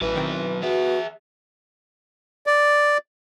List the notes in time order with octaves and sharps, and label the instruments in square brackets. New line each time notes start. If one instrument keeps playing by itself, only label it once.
[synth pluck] A1 [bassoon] E3 [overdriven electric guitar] F#3 B4
[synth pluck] D#3 C4
[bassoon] B3 [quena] F#4 [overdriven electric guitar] G#4 E5
[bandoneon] D5